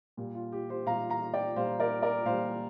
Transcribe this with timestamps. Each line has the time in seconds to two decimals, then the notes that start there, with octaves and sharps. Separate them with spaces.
0.17 A#2 G3
0.35 F4
0.52 G4
0.69 G4 C5
0.86 A#2 F5 A#5
0.90 G3
1.10 F5 A#5
1.34 D5 G5
1.56 A#2 G3 C5 F5
1.80 A#4 D5
2.03 A#4 D5
2.25 A#2 G3 C5 F5